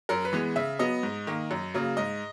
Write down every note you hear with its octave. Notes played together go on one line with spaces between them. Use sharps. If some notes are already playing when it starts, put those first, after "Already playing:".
F#2 A#4
B4
E3 G#3 B3
C#3 E5
F#3 B3 D#5
G#2
D#3 A#3
F#2
C#3 F#3 A#3
G#2 D#5